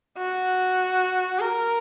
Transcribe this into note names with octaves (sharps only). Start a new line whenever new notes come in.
F#4
A#4